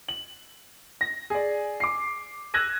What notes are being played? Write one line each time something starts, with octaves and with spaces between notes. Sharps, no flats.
F#7
A#6
G#4 D5
D6 C7
E6 F#6 G#6 A#6 D#7